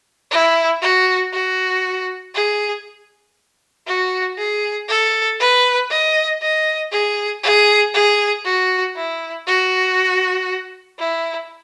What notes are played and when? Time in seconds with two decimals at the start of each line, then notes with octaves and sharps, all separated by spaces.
0.31 E4
0.82 F#4
1.33 F#4
2.35 G#4
3.87 F#4
4.38 G#4
4.89 A4
5.40 B4
5.90 D#5
6.42 D#5
6.92 G#4
7.44 G#4
7.94 G#4
8.45 F#4
8.96 E4
9.47 F#4
10.99 E4